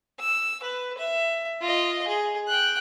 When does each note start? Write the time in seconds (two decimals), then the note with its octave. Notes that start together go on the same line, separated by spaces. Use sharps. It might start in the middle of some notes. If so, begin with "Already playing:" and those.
0.20 E6
0.63 B4
0.98 E5
1.61 F4 D#5
2.07 G#4
2.47 G5 F#6